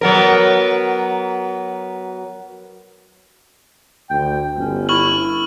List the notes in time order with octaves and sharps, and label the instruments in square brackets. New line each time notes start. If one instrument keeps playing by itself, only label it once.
[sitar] F#3 B3 A#4
[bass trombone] D2 [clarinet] G5
[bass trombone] G1 [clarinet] C#4
[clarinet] E4 [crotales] C#6 F6 F#7